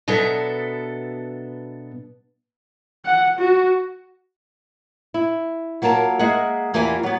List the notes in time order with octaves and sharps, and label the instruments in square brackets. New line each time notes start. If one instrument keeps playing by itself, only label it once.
[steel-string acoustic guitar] B2 F#3 B3 D4 A4 E5
[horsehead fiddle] F#5
F#4
[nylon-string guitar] E4
F#3 A#3 F4 A#4 A5
G#3 A#3 G#4 E5 F#5
E2 E3 A#3 F4 G4 G#5
F#3 B3